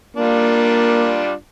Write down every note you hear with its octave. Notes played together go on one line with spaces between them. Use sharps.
G3 A#3 D4 F4